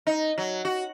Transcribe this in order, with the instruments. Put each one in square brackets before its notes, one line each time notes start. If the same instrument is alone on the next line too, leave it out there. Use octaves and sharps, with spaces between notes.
[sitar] D#4
F#3
F#4